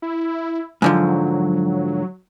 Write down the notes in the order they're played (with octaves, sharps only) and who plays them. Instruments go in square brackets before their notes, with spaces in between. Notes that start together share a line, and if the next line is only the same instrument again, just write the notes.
[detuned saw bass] E4
[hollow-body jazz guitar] G#2 D3 F3 [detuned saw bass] F#3